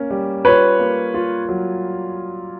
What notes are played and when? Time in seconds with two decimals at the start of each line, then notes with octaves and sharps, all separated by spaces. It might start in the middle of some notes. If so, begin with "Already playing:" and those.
Already playing: A#3 C#4
0.10 G3
0.45 F4 B4 C#5
0.79 A#3
1.14 F4
1.49 F#3